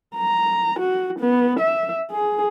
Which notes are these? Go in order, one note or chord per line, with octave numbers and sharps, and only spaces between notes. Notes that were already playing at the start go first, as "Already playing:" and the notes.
A#5
F#4
B3
E5
G#4